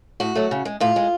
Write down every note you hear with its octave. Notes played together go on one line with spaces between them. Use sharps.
A2 F#4
F#3 A3
C#3
G#3
A2 F4
G#3